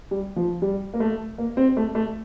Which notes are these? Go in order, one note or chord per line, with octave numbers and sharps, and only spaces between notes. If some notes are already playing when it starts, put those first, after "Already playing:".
G3
F3
G3
A#3
A3
A#3
C4
A3
A3